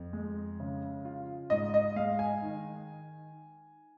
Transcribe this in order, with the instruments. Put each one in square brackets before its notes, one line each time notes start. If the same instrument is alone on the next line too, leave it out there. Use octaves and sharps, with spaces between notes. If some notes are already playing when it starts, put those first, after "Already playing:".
Already playing: [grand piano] F2
G#3
C#3
F4
[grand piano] G#2 [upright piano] D#5
[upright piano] D#5
[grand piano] G#3 [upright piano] F5
[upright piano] G#5
[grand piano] D#3